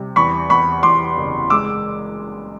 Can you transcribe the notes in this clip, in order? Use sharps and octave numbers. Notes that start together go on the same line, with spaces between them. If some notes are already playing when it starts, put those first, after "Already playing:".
Already playing: C3 G3
E2 B5 C#6
E2 B5 C#6
E2 C6 D6
F#1
G#3 D6 E6